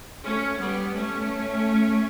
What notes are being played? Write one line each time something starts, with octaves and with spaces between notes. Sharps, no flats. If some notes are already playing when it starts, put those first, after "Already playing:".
A3 C#4
G3 B3
A3 C#4